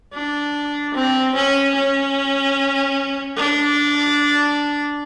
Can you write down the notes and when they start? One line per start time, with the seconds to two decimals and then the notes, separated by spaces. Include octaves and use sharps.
0.14 D4
0.95 C4
1.35 C#4
1.75 C#4
3.37 D4